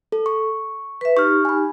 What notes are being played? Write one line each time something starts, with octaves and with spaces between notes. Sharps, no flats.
A4
C#6
B4 E5
D#4 G4 C#6 F6
G#5 B5